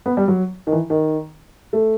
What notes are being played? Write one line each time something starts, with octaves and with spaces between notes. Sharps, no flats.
B3
G3
F#3
D#3
E3
D#3
A3